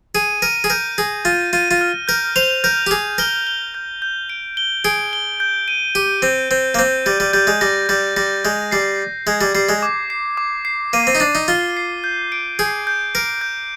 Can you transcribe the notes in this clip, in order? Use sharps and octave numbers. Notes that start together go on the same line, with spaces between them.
G#4 D#7
A#4 D#7
G#4
A#4 G6
G#4 A#6
F4 D#7
F4 D#7
F4
F6
A#4 G6
C5 F7
A#4 G6
G4
G#4 F7
A#4 G7
G7
G6
G6
D7
G7
G#4 D7
G7
G6
D#7
G4 D#7
C4 G6
C4 G6
A#3
C4 G6
G3 G6
G3
G3 G6
G#3
G3 A#6
G3 G6
G3 A#6
G#3 G6
G3 C7
C7
G#3 G#6
G3
G3 C7
G#3
D6
C7
D6
C7
A#3 D#7
C4
D#4
D4 C7
D#4
F4 G7
C7
G6
D7
G#4 G6
G6
A#4 D7
G6